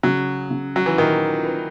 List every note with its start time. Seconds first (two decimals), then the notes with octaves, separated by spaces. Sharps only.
0.03 C#3 F#3
0.51 C#3
0.76 F#3
0.86 E3
0.98 A#2 D#3
1.45 B4